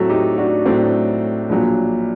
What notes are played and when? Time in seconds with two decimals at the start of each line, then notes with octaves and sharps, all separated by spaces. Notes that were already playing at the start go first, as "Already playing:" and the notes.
Already playing: A2 F#3 A3 C4 F#4 A4
0.10 D#4 G4
0.38 D4 F#4
0.65 A2 F#3 A3 C4 D4
1.49 A#1 A#2 F#3